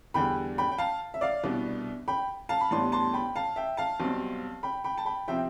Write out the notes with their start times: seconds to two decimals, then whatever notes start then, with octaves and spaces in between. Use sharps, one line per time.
0.14 E2 D3 G3 G5 B5
0.58 G5 B5
0.72 G5
0.78 F5 A5
1.14 E5
1.21 D5 F5
1.43 C2 B2 B3 D4
2.08 G5 B5
2.49 F5 A5
2.61 B5
2.71 A1 A2 G3 B3 D4 A5 C6
2.92 A5 C6
3.13 G5 B5
3.36 F5 A5
3.56 E5 G5
3.77 F5 A5
4.00 B1 B2 G3 C4
4.63 G5 B5
4.84 G5 B5
4.98 A5
5.05 G5 B5
5.28 C3 F3 C4 E5 G5